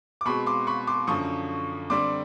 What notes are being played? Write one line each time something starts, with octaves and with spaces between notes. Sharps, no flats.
D6
B2 G#3 C4 B5 C#6
C6 D6
B5 C#6
C6 D6
F#2 D3 F3 C#6 D#6
D3 G3 C4 C6 D6